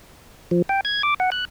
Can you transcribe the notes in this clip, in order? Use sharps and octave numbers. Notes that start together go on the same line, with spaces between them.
F3
G5
G#6
D6
F#5
F#6